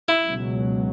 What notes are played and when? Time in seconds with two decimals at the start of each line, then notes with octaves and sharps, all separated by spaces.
0.08 E4
0.24 C#2 B2 F#3